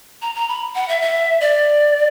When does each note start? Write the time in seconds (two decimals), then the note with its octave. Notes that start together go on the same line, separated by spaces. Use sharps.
0.22 A#5
0.35 A#5
0.49 B5
0.75 F#5
0.88 E5
1.01 E5
1.41 D5